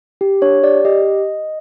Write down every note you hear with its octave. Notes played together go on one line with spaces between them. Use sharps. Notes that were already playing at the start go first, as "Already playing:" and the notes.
G4
D4 C#5
G4 D5
G4 D#5